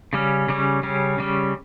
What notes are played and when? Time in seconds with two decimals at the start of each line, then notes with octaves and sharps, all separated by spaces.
0.13 C#3 G3 C#4
0.48 C#3 G3 C#4
0.83 C#3 G3 C#4
1.18 C#3 G3 C#4